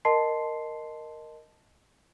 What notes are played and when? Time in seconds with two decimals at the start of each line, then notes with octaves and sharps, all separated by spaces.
0.05 A#4 D#5 A5 C6 C7